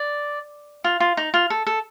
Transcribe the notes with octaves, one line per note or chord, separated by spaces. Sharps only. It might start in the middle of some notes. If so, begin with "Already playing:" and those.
Already playing: D5
F4
F4
D#4
F4
A4
A4